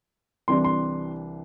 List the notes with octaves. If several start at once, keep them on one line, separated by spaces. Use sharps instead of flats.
C2 C3 E3 G3 D4 C6
C6